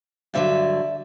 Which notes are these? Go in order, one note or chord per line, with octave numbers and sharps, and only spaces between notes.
G2 D3 F#3 D5 E5